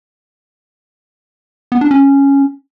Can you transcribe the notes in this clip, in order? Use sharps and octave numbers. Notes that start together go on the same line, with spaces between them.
B3
D4
C#4